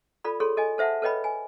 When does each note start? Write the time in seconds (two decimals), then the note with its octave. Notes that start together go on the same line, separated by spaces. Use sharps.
0.24 F4 A4 D5 B5
0.40 G#4 A4 C#5 C6
0.57 A4 D#5 G#5
0.78 A4 C5 E5 F#5 A5
1.02 A4 B4 C#5 D#5 G5 B5
1.24 G#5